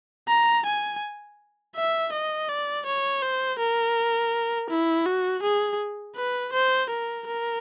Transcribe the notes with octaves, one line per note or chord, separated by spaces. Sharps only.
A#5
G#5
E5
D#5
D5
C#5
C5
A#4
E4
F#4
G#4
B4
C5
A#4
A#4